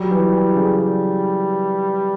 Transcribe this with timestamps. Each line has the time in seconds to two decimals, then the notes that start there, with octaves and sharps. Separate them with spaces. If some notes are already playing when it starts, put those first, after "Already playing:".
Already playing: F#3 G3
0.11 E3
0.32 E3
0.55 C#3
0.78 G3